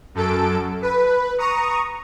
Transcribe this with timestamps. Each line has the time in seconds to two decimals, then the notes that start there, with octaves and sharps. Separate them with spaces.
0.15 F#2 A4 D7
0.82 B4
1.38 A#5 C#6 D#6